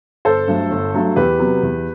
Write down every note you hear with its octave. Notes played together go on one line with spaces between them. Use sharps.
G1 A4 C5
G2 F#3 A3
G1
G2 F#3 A3
E2 G4 B4
C3 F#3 B3
E2